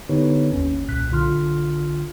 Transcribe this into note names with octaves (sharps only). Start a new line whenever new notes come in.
D3 B3 D#4 G4 B4 C#5
G1 D#2 C#4
C2 A#2 F#6 B6
B1 D3 F4 C6 F6